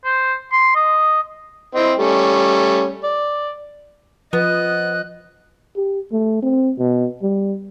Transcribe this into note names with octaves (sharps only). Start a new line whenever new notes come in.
C5
C6
D#5
C4 E4 D#5
G3 A3 C#4
D5
F3 B3 D#5 F#6
G4
A3
C4
B2
G3